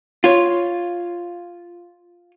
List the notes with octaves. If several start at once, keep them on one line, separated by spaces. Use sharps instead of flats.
F4 C#5